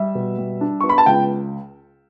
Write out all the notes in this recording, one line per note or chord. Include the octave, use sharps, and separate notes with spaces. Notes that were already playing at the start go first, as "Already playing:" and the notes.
Already playing: G3 E5
B2
G3
D4
B3 C#6
B5
A5
C#2 G5